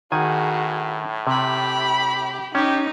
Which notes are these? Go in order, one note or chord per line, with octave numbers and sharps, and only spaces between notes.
A2 D#3 F#4 G#4 G#5
C3 G4 B5
C#4 D#4 G4